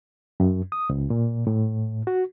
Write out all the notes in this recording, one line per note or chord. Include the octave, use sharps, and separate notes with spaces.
F#2
D#6
C#2
A#2
A2
F#4